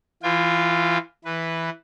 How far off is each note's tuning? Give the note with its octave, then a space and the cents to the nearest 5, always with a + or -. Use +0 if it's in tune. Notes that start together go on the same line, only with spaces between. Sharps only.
E3 +20 F4 +0 G5 +45
E3 +0 B4 +0